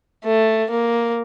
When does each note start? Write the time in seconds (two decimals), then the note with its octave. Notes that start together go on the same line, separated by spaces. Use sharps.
0.25 A3
0.71 A#3